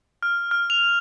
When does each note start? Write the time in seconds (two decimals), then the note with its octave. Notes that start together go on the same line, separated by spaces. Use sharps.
0.23 F6
0.51 F6
0.70 F7